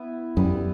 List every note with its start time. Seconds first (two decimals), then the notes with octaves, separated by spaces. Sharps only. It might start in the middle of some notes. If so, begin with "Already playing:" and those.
Already playing: B3 E4 B4 E5
0.36 F#2 G3 B3 E4 B4